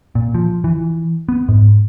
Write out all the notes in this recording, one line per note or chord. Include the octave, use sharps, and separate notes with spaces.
A#2
F3
E3
B3
G#2